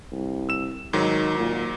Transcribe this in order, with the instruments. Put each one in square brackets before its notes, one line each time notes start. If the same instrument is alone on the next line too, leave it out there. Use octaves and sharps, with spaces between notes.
[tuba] C2
[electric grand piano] E6 E7
[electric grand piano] G#2 F#3 [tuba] D#3
[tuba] A#2